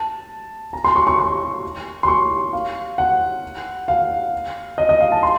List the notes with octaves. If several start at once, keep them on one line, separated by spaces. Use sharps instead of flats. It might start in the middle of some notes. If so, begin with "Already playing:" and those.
Already playing: A5
A#5
C6
C#6
C#6
C#6
C6
C#6
F5
F#5
F5
D#5
D#5
F5
A5
C6